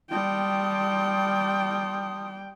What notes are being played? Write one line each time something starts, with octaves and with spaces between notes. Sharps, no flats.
G3 G5 A5 C6 D#6